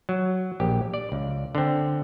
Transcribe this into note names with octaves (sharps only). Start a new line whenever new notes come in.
F#3
A#1 G4
D5
C#2
D3 C4